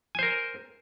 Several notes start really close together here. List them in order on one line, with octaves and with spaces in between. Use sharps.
G#5 C5 A#4